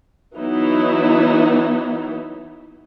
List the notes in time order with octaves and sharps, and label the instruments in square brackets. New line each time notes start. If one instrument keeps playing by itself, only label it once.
[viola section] E3 F#3 B3 D#4 E4